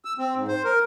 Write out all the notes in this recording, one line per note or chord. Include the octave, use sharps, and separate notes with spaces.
E6
C4
G#2
C5
A#4